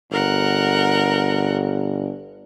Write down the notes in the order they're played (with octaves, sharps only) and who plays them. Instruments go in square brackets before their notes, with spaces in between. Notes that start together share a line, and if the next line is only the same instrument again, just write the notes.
[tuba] G1 [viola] A#4 F#5